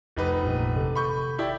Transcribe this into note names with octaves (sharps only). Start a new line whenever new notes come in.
F1 D#4 B4
A1 G2 A#2
G#1 C3 A4
B5 C#6 G6
E4 G4 D5